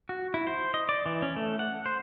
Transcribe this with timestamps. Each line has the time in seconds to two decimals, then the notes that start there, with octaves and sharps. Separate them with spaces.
0.09 F#4
0.34 E4
0.47 C5
0.74 D#5
0.89 D5
1.06 E3
1.22 C#4
1.36 A3
1.59 F#5
1.86 C5